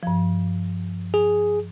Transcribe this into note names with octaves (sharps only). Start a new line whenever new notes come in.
G2 F3
G#4